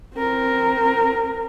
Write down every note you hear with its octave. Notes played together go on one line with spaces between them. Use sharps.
C4 A#4